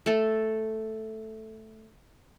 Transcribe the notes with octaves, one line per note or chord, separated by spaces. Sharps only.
A3 A4